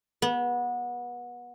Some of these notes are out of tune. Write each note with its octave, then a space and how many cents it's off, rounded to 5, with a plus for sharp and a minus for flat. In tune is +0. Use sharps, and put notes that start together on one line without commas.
B3 -25